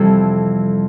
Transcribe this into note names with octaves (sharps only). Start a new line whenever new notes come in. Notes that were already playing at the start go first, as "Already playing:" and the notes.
Already playing: F2 C3 E3 G3 A4